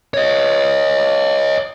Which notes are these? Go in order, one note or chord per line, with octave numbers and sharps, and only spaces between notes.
C#5 D#5